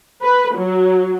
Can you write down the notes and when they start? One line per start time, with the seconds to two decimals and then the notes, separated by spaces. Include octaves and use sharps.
0.22 B4
0.56 F#3